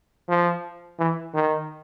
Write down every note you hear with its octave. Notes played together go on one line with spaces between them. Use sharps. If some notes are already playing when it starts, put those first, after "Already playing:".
F3
E3
D#3